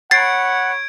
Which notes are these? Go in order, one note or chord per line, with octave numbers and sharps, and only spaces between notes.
C#5 F#5 B5 G#6 A6 C7 D7